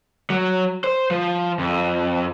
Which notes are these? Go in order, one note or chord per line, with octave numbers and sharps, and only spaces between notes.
F#3
C5
F3
F2